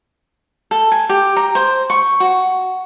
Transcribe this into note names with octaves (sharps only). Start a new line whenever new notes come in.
A4
G#5
G4
A#5
C5
C#6
F#4